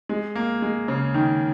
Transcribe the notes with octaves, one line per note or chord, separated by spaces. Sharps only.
G#3
A#3
G#3
C#3
D#3